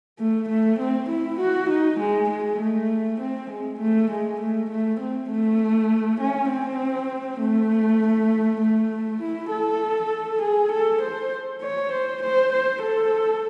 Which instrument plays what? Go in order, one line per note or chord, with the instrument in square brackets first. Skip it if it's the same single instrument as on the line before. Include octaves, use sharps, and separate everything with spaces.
[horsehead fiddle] A3
A3
C4
E4
F#4
D#4
G#3
G#3
A3
C4
G#3
A3
G#3
A3
A3
C4
A3
C#4
C4
A3
A3
E4
A4
G#4
A4
C5
C#5
C5
C5
C5
A4